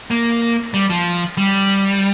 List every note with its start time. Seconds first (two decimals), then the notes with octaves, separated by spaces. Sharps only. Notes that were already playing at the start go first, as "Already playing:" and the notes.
0.11 A#3
0.74 G3
0.90 F3
1.37 G3